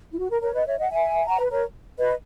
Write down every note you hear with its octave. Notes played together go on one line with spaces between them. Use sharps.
E4
F#4
A#4
A#4 C#5
B4 D#5
C#5 E5
D#5 F#5
E5 G#5
F#5 A#5
B4
A#4 C#5
B4 D#5